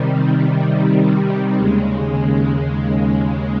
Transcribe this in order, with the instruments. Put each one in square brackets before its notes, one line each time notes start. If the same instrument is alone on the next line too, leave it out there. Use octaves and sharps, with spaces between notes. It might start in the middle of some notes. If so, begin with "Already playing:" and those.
Already playing: [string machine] C3 D#3 G3
D#2 C#3 G#3